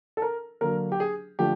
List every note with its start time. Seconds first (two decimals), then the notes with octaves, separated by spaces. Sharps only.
0.17 A4
0.22 A#4
0.61 D3 F#3 A#3 A#4
0.92 G4
1.00 G#4
1.39 D3 F3 A3 G4